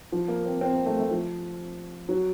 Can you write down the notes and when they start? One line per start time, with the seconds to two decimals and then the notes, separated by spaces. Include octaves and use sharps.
0.12 F3
0.28 A#3
0.46 C4
0.61 C4
0.74 A#3
0.86 A3
0.99 A3
1.11 F3
2.09 F#3